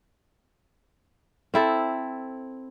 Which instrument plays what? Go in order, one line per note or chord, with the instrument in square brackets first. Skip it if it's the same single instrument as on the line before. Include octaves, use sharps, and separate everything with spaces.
[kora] C4 E4 A4